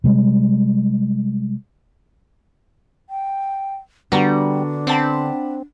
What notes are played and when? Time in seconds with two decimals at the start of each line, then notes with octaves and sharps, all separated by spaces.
0.04 C3 G3 G#3
3.10 G5
4.12 D3 G3 B3 D4 F#4 A#5
4.87 C4 F#5 A5 B5